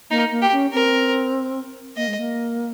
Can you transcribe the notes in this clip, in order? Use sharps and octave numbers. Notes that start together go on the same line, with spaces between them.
A#3 D#4
A#3
G4
C#4
C4 A#4
A#3 D#5
G#3
A#3